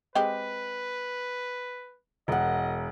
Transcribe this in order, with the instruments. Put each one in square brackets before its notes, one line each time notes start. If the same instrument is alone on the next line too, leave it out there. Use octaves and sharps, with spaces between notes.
[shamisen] G#3 C4 G4 [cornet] B4
[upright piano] E1 [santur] A#4 F#5 [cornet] D#5